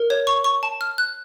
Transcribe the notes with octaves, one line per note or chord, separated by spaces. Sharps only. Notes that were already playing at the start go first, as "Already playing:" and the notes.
Already playing: A#4
C#5
C#6
C#6
A5
F6
F#6